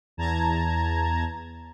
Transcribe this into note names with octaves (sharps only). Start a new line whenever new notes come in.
E2 A5 A#5 G#6